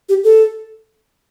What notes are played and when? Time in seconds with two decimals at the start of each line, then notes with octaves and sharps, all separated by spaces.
0.09 G4
0.24 A4